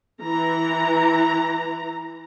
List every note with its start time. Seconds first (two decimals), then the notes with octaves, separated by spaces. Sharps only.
0.22 E3 A#5